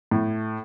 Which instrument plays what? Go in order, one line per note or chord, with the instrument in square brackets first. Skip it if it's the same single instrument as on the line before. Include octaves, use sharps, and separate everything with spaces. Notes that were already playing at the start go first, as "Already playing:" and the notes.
[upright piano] A2